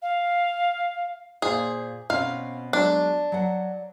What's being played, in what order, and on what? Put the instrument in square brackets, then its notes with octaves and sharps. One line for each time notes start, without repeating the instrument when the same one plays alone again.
[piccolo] F5
[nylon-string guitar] A#2 C5 F5 [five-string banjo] G#4
[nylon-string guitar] B2 C4 C#4 [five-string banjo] F5
[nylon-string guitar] F#3 G#3 [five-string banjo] D4
[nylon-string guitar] F#3 F#5